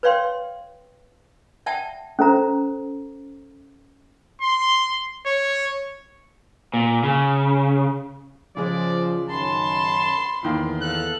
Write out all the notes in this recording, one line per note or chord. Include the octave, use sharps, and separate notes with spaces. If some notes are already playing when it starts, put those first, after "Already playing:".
B4 C#5 D5 F5 G5 C6
D5 E5 F#5 G5 A5
C#4 A4 C5 A#5
C6
C#5
A#2
C#3
C#3 F3 G#3 D5
F#2 D#3 C#4 A5 B5 C6
E2 A2 D#3 A#3
A4 F5 F#6